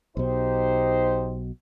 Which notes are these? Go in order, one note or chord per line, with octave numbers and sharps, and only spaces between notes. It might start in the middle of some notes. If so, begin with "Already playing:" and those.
B1 B2 D#4 G4 C5